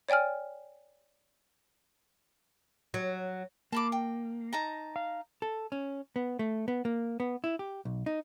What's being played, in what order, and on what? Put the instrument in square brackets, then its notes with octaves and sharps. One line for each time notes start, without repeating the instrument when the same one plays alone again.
[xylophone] C#5 D5 G5 G#5 F6
[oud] F#3
[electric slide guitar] A#3 [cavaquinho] A5 B5 D6
[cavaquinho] G5
D#4 A5 A#5
[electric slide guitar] F5
[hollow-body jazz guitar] A4
C#4
B3
A3
B3
A#3
B3
E4
G4
B1
D#4